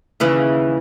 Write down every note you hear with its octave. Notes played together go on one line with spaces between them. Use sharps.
D#2 C#3 E3